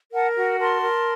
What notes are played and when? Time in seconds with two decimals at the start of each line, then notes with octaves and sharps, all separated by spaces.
0.13 A#4 F#5 A5
0.37 F#4
0.59 A#4 A5 C6
0.82 A#4